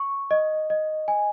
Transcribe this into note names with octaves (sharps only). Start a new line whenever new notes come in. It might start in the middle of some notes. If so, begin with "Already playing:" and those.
Already playing: C#6
D#5
D#5
G#5